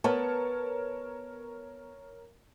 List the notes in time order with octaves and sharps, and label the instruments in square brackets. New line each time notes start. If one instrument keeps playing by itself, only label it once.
[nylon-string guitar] B3 [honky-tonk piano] A#4 C#5 A5